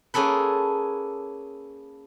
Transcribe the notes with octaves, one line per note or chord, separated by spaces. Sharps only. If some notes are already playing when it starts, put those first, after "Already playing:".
A#3 C#4 G#4 A4 B4